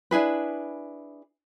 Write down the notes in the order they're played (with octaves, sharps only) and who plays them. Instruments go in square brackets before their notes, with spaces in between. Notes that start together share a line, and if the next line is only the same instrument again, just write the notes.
[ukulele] D4 E4 G#4 B4